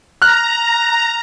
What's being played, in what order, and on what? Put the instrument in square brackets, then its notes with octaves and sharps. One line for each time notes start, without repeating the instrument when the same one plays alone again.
[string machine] A#5 [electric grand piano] F6 F#6